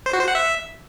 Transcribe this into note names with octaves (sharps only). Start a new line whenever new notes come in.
C5
F#4
C5
F#5
E5